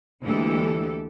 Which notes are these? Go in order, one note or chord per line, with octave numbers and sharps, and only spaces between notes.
D2 E3 G#3 A#3 G4 A4